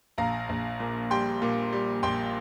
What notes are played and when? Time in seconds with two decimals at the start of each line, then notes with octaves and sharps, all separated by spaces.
0.18 A#1 F5 A#5
0.49 A#1
0.80 A#2
1.11 G3 G5 C6
1.42 A#2
1.73 G3
2.03 A#1 G5 C6